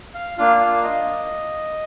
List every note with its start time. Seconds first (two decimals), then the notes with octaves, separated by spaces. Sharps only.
0.14 F5
0.38 A#3 D4 F4 F5
0.60 F5
0.83 D#5